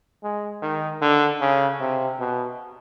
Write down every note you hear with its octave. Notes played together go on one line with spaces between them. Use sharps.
G#3
D#3
D3
C#3
C3
B2